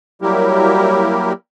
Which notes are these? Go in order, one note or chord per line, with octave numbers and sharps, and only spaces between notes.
F#3 G3 A#3 E4 G4 A#4